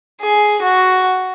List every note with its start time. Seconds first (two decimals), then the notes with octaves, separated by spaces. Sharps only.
0.20 G#4
0.62 F#4